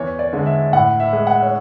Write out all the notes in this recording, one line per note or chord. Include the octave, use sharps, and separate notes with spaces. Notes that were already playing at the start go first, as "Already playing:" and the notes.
Already playing: E2 C#5
D5
D3 G#3
E5
A2 F#5
E5
G#3
F#5
C#5